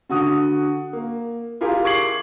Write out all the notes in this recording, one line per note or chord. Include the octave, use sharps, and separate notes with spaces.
D3 F#4 D#6
A#3
E4 F4 G4 G#4 A#4
C#6 D6 G#6 C7 F#7